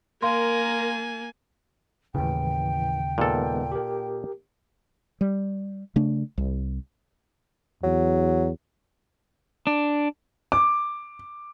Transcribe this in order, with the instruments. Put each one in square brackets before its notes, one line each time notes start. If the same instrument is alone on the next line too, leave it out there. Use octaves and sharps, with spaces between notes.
[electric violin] A#3 G#5 [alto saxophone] A#4 [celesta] F5 C6
[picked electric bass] D#2 C#3 [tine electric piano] A2 E3 [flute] G5
[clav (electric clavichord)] A#2 A4 [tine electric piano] D#3 G#3 B3
[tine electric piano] G4 A#4
[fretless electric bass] G3
C#3 A3 D4
C2
[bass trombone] E2 [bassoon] F#3
[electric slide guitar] D4
[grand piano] D6